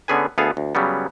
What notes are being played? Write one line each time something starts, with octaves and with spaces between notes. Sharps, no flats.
D3 B3 C#4 G#4 B4 G#5
D2 B3 G#4 A4 F5
D2
C#3 F#3 G3 B3